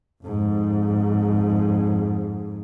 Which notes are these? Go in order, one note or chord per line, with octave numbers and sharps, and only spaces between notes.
F2 G#2